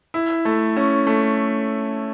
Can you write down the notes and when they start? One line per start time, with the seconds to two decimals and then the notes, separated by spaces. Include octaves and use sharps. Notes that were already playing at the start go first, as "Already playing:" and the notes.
0.14 E4
0.45 A3
0.77 C#4
1.07 A3